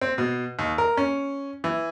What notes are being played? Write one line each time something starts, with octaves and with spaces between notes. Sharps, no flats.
C4
B2
D#2
A#4
C#4
E3